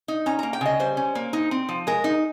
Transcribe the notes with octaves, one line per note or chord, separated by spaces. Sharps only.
D#4
C#4 A#5
A#3 A#5
G5
C#3 D#5
G3 C5
C#4
A#3
D#4
C4
F3
G#3 A#4
D#4